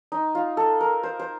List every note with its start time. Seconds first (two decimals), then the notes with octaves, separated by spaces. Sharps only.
0.12 D#4
0.35 F4
0.57 A4
0.81 A#4
1.03 C5
1.19 C5